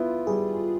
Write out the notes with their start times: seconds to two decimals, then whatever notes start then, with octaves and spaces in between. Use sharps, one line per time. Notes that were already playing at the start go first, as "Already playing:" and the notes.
Already playing: B3 E4 F4
0.27 G3 G#4